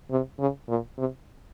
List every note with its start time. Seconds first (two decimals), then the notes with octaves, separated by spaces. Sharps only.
0.11 C3
0.39 C#3
0.69 A#2
0.97 C3